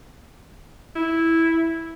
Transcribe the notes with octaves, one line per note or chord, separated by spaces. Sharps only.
E4